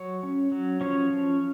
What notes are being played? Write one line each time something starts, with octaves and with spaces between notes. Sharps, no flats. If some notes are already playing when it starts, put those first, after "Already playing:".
Already playing: F#3 C#5
C#4
F#3
F3 C#4 C#5
F3